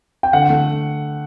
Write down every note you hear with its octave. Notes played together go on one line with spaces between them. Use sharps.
G5
D3 F#5
A3